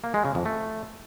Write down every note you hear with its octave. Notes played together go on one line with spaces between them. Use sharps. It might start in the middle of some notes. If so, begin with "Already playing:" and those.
A#3
G#3
C#3
F2
A3